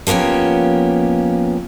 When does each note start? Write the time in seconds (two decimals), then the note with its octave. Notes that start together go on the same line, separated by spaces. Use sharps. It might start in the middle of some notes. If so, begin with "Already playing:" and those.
0.07 F3 A#3 B3 C#4 G4